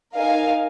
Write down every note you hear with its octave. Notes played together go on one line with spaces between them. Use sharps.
D#4 A#4 F5 G#5